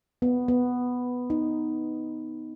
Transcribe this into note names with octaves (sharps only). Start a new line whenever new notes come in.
B3
B3
D#4